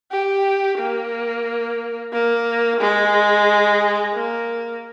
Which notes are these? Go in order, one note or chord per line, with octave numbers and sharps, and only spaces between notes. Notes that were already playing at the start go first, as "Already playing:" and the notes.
G4
A#3
A#3
G#3
A#3